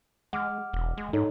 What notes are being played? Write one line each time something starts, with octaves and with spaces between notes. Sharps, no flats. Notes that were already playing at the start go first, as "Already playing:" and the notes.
G#3 F#5 D6 F6
E1
G#3
G#2 D#4 A4 C#5